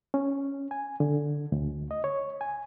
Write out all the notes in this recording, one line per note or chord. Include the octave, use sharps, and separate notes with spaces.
C#4
G#5
D3
D2
D#5
C#5
G#5